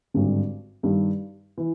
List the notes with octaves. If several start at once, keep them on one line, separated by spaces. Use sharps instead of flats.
G#1 G2 D3
G2 D#3 G3
E3